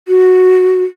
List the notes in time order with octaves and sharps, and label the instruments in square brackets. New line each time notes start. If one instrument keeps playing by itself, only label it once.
[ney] F#4